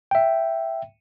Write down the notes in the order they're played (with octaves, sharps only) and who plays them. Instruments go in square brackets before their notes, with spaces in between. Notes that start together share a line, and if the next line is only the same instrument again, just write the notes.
[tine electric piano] E5 G5